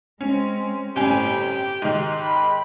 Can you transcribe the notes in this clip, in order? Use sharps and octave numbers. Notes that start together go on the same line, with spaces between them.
G#3 C4 C#4
G1 A2 C3 G3 C#4 G4 G#5
G5
G#2 D#3
G5 B5